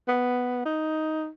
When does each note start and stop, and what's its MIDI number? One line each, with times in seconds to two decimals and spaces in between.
0.08 0.63 59
0.65 1.28 63